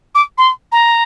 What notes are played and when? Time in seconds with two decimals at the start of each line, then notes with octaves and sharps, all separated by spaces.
0.15 D6
0.38 C6
0.72 A#5